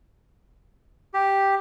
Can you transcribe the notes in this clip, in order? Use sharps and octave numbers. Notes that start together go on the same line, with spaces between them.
G4